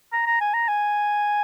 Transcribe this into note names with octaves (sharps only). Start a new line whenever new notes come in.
A#5
A#5
G#5
A#5
G#5